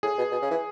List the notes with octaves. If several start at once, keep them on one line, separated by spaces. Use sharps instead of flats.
A2 G#4
B2
B2
C#3
E3